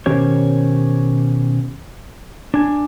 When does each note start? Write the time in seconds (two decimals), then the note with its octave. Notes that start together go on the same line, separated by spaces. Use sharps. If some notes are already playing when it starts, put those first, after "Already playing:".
0.06 B2 D#3 C#4 G4 C5 C#5
2.54 D4 G#5